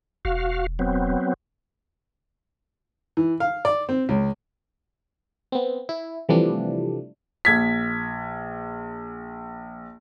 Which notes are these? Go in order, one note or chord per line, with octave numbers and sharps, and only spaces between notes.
E1 F#4 F5
F#3 B3 C4
E3
F5
D5
C4
C#2
B3 C4
E4
C3 E3 F3 G3 A3 D4
A#1 G#6 B6